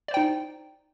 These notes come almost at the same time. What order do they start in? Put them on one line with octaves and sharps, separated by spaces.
D5 C5 G5 D#4